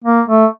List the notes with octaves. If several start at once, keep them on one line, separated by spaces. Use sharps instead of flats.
A#3
A3